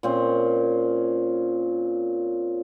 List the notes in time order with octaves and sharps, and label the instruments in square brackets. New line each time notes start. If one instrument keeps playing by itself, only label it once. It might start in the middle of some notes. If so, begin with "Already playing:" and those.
[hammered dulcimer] A#2 C4 C#4